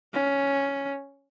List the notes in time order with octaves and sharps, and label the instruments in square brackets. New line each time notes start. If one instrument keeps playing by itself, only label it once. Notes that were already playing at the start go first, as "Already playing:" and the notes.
[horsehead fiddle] C#4